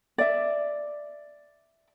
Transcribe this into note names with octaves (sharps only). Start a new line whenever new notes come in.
D5 E5